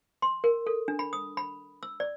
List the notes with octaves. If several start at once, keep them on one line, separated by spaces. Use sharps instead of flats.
C6
A#4
A4
D4
B5
D#6
B5
E6
D5